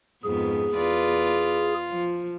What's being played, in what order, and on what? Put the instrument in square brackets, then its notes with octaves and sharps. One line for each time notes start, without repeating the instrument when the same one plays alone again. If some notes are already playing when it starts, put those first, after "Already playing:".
[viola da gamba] F2 G#2 B3 [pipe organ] G#4
[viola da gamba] E2 B4 D5 [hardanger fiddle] F4
[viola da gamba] F3